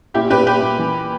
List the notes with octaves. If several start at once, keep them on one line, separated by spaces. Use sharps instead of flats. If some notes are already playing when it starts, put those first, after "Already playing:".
A#2 E4 G4
A#2 G4 B4
A#2 G4 B4
A#2
E3